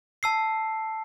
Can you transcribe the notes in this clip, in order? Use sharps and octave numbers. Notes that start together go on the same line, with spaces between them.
A5 E6 C7